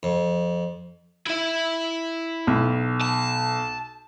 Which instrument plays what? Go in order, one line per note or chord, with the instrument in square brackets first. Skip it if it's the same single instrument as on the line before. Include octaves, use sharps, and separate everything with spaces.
[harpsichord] F2
[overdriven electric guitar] E4 E5
[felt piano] B1
[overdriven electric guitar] A5